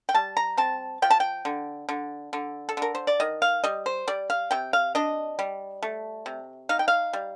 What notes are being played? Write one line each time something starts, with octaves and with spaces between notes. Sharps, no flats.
G5
G3 A5
A#5
C4 A5
F3 G5
A5
G5
D3
D3
D3
A4
D3 A#4
C5
D5
D#3 D#5
F5
G3 D#5
C5
G3 D5
F5
C3 G5
F5
D4 D#5
G3
A3
C3
D#4 F5
G5
F5
G3